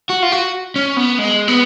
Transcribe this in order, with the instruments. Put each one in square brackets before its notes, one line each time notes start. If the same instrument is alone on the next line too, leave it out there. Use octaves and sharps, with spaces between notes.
[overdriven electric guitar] F#4
F4
F#4
C#4
B3
G#3
B3